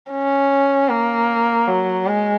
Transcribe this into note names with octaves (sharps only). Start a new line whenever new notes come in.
C#4
A#3
F#3
G#3